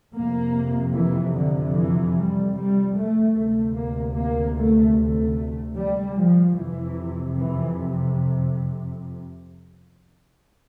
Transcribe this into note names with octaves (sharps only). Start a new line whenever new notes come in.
F2 C3 A#3
E3
D3
E3
G3
G3
A3
D2 C3 A3
A#3
A#3
A3
A3
G3
F3
F2 C3 E3
E3